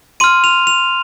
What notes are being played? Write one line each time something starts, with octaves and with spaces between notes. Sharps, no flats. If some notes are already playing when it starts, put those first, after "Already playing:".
C6 F6 D#7
F7
F7